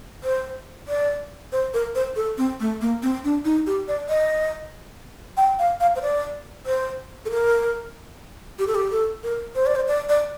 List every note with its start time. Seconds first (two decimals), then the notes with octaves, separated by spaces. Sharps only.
0.24 C5
0.88 D5
1.52 C5
1.74 A#4
1.95 C5
2.16 A4
2.38 C4
2.60 A3
2.81 A#3
3.02 C4
3.24 D4
3.45 D#4
3.67 G4
3.88 D5
4.09 D#5
5.37 G5
5.59 F5
5.80 F5
5.96 C5
6.02 D5
6.66 C5
7.25 A4
7.31 A#4
8.59 G4
8.67 A4
8.75 G4
8.91 A4
9.24 A#4
9.55 C5
9.66 D5
9.75 C5
9.88 D5
10.09 D5